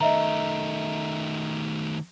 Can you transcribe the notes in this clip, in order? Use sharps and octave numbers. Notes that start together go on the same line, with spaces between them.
D#3 A3 D#5 E5 A#5